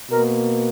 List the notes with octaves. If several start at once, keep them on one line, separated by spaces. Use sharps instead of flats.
B2 A#3 A#4